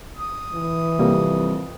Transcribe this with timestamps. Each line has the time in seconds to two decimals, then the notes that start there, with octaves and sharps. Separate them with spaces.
0.17 D#6
0.54 E3
0.99 F2 C3 G3 A#3